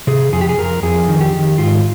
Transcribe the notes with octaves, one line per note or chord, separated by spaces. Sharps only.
C3 G#4
F2 G#4
G4
G#4
F2 A#4
F2 G#4
D#3
G4
D#3
G#2 F4